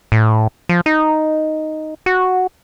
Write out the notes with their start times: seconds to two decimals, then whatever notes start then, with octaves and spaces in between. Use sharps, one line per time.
0.12 A2
0.69 F3
0.86 D#4
2.06 F#4